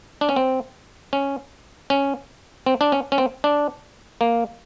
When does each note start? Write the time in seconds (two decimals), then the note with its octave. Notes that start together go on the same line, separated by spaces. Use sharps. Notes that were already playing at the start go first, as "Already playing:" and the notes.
0.21 D4
0.29 C#4
0.36 C4
1.13 C#4
1.90 C#4
2.66 C4
2.81 D4
2.92 C#4
3.12 C#4
3.18 C4
3.44 D4
4.21 A#3